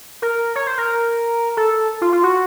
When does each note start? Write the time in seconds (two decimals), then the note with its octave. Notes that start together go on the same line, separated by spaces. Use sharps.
0.22 A#4
0.56 C#5
0.67 C5
0.78 A#4
1.57 A4
2.01 F4
2.12 F4
2.23 F#4